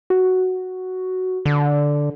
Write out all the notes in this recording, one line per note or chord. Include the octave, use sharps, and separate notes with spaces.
F#4
D3